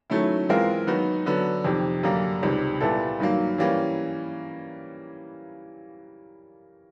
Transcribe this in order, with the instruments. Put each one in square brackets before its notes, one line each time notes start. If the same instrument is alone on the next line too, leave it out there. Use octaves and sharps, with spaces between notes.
[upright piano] D#3 F#3 A3 C#4 E4
E3 G#3 C4 F4 A#4
D#3 F#3 B3 D#4 F#4
D3 F#3 B3
F2 C3 D#3
F#2 D3 G3 A#3
C#2 C3 D#3 G3
A#2 G3 B3 E4 A4
G2 D#3 F#3 A#3
E3 G3 A#3 C#4